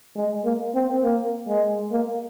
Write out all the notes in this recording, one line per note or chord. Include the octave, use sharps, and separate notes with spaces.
G#3
A#3
C4
A#3
G#3
A#3